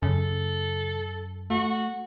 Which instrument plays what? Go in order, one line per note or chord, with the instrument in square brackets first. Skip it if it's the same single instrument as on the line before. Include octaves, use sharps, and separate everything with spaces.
[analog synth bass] F#2 [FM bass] C#3 [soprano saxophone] A4
[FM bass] A3 [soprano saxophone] F#4